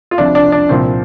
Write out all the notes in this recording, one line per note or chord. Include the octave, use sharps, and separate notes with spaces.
F4
C2 C3 F3 D4
D4
D4
C2 A#2 F3 C4